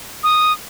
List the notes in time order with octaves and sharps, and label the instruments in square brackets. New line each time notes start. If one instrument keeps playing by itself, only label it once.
[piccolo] D#6